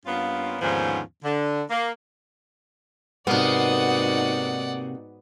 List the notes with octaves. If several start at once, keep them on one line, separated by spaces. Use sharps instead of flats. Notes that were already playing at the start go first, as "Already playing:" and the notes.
G2 A#3 B3 C#4 F4
D#2 G#2 D3 F3 B3 C#4
D3
A#3
G#2 C3 A#3 B3 D#4 F#4 D5 F#5